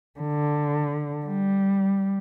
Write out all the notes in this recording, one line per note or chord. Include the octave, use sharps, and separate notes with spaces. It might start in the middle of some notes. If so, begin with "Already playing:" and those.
D3
G3